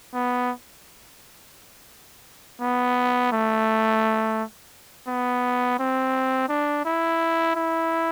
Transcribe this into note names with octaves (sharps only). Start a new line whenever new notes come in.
B3
B3
A3
B3
C4
D4
E4
E4